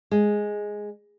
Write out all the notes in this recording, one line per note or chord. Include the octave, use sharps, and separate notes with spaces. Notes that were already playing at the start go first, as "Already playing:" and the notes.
G#3